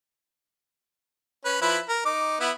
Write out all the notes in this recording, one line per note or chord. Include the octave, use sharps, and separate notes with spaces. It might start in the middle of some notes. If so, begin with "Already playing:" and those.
C#4 B4
F3 E4 B4
A#4
D#4 D6
B3 E4